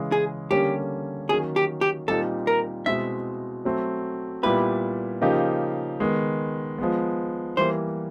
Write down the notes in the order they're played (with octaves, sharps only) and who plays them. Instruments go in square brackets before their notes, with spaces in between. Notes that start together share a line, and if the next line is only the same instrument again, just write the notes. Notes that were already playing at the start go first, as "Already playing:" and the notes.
Already playing: [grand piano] C#3 E3 G#3
[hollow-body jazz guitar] G#4
[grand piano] D3 G3 A#3 C#4 [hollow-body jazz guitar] G4
[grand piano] D#3 F#3 A#3 C#4 [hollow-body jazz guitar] G#4
[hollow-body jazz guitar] G4
G4
[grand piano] A#2 G3 C4 D#4 [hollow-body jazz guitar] A4
[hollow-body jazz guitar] A#4
[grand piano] B2 G#3 C4 E4 [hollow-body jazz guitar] E5
[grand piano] F#3 A3 C4
[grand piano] A#2 G3 B3 E4 G4 [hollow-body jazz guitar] B4
[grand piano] C#3 F3 A#3 D#4 G4
D#3 G#3 B3
F3 G#3 B3
[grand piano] E3 G3 A#3 [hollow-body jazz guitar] C5